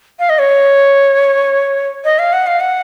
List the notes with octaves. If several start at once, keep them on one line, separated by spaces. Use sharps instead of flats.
F5
D#5
C#5
D#5
F5
F#5
F5
F#5